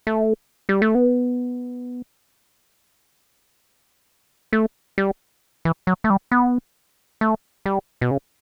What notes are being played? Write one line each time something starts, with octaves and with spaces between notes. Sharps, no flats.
A3
G3
A3
B3
A3
G3
E3
F#3
A3
G3
B3
A3
G3
B2
C#3